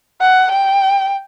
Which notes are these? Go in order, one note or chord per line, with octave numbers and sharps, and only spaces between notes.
F#5
G5